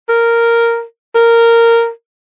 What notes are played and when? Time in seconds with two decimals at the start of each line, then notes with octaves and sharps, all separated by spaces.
0.09 A#4
1.15 A#4